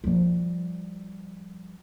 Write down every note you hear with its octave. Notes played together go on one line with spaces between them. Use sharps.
F3 G3